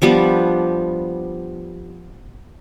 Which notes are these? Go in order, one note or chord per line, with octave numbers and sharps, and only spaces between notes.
F3 G3 B3 D4